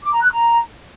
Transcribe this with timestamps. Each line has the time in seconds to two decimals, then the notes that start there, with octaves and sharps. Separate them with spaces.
0.03 D6
0.13 A#5
0.22 F#6
0.32 A#5